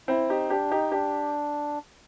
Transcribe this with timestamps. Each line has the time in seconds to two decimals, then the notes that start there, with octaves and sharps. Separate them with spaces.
0.08 C4 E4
0.29 D#4 G4
0.50 D4 G4
0.71 D#4 G4
0.92 D4 G4